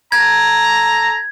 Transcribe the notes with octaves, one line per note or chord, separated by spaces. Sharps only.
A4 A#5 G#6